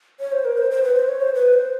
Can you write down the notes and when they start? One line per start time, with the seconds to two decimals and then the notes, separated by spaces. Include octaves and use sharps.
0.20 C#5
0.32 C5
0.45 A#4
0.58 C5
0.71 C5
0.83 B4
0.95 C5
1.08 C#5
1.22 C5
1.34 B4
1.54 C5